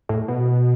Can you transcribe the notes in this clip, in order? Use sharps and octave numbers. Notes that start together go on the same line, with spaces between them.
A2
B2